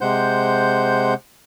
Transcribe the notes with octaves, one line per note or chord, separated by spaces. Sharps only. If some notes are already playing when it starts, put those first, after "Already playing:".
C3 G#3 C5 F#5 G6